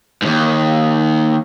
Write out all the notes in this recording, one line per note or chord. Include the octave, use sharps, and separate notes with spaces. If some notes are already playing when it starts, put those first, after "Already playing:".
D#2 G#2